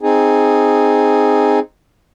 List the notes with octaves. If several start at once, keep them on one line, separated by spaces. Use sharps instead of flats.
C4 D#4 G#4